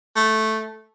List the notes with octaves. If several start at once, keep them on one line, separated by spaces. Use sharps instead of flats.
A3